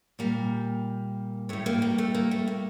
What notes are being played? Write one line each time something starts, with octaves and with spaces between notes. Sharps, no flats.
A#2 G3 A#3
A2 G3 A3
A#3
A#3
A3
A#3
A3
A#3